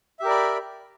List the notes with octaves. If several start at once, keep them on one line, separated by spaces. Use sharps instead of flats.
G4 A#4 D5 E5 B5